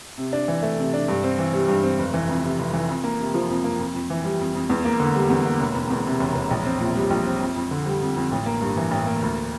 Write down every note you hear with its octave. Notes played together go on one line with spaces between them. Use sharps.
C3
D4
E3
A3
C3
D4
G2
C4
E3
G3
G2
C4
F1
E3
F2
C3
F1
E3
F2
A#3
C3
F3
F2
A#3
F2
F2
E3
G3
F2
F2
E2
A#3
D3
G3
E2
A#3
E1
E1
E2
C3
E1
E1
A#1
C4
A#2
G3
A#1
C4
F2
F2
D3
G3
F2
F2
A1
A#3
G2
E3
A1
A#3
D2